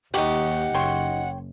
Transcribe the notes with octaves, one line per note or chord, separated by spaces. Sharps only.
D#2 D#4 G4 F#5 C#6 D#6
F#1 C#5 G5 C6